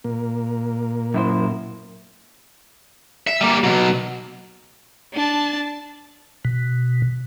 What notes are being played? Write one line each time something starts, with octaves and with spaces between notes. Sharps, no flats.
A#2 A#3
F#2 E4 C5
E5
G3 A#3
B2 F#3
D4 A5
B2